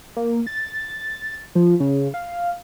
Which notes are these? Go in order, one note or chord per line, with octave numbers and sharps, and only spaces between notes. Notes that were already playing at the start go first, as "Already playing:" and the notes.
A#3
A6
F3
C#3
F5